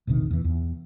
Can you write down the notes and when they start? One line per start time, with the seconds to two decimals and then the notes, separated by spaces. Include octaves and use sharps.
0.07 E1 A#1 C3 D#3
0.31 E2 E3
0.44 E2